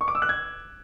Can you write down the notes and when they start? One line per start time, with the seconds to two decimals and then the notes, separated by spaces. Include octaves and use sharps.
0.01 C#6
0.08 D6
0.15 E6
0.22 F#6
0.29 G#6